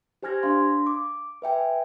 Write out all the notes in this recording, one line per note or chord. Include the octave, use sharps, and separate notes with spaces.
G4 C5 G#5 F6 G#6 A#6
D4 F5 C6
D6
B4 E5 G5 G#5